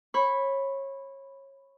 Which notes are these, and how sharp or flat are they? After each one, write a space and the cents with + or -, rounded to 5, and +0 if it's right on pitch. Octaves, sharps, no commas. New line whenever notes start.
C#5 -25 B5 +0